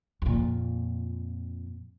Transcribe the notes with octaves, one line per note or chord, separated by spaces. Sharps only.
F2 A#2